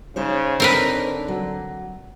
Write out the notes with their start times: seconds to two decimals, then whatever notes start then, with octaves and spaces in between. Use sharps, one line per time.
0.16 C#3 D#4 C5 C#5
0.60 D3 C4 A#4 B4
1.28 F#3